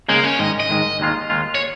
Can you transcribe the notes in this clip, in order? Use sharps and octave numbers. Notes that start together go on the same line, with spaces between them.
C#3 G#3 A#3 D#4 G#4
C#4
G#2 D#3 G#3 D#5
D#5
G#2 D#3 G#3
D#2 D#3 G#3 F4
D#2 D#3 G#3 F4
C#5